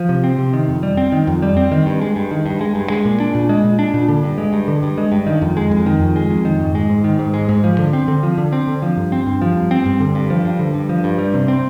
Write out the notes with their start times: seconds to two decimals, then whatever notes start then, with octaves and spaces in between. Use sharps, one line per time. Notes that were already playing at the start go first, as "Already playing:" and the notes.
Already playing: F3
0.09 C3
0.24 C4
0.38 C3
0.53 D#3
0.68 F2
0.83 G3
0.97 C4
1.12 D#3
1.27 F2
1.42 G3
1.57 C4
1.71 D#3
1.86 G2
2.01 G#3
2.16 G2
2.31 D#3
2.46 G2
2.61 G#3
2.75 G2
2.90 G#3
3.05 A#2
3.20 D4
3.35 A#2
3.49 G#3
3.64 A#2
3.79 D4
3.94 A#2
4.09 D3
4.23 G2
4.38 G#3
4.53 G2
4.68 D3
4.83 G2
4.98 G#3
5.12 G2
5.27 D#3
5.42 F2
5.57 G#3
5.71 F2
5.86 D#3
6.00 F2
6.16 G#3
6.30 F2
6.45 D#3
6.60 G#2
6.75 G#3
6.90 G#2
7.04 D#3
7.19 G#2
7.34 G#3
7.49 G#2
7.64 F3
7.78 D3
7.93 C4
8.08 D3
8.23 F3
8.38 D3
8.53 C4
8.67 D3
8.82 F3
8.97 G2
9.12 C4
9.26 G2
9.42 F3
9.56 G2
9.71 C4
9.86 G2
10.00 D3
10.15 G2
10.30 F3
10.45 G2
10.59 D3
10.74 G2
10.89 F3
11.04 G2
11.19 G3
11.34 C3
11.48 C4